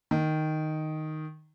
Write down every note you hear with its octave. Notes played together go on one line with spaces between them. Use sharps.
D#3